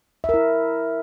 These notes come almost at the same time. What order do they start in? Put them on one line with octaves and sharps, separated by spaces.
E5 A#4 E4